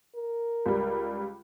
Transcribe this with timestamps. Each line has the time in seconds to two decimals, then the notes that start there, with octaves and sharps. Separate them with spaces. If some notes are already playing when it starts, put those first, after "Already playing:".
0.16 A#4
0.66 C#2 G3